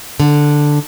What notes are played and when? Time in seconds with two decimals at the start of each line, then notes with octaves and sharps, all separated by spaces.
0.20 D3